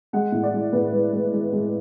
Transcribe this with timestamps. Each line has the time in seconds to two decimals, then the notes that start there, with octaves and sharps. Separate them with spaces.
0.13 G#3 F#5
0.32 A2
0.43 D5
0.53 G#3
0.73 A2 B4
0.92 G#3
1.12 G#3
1.33 G#3
1.52 G#3